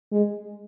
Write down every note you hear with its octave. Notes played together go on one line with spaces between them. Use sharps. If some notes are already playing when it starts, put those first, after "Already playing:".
G#3